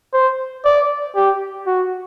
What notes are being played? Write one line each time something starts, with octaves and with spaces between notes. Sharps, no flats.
C5
D5
G4
F#4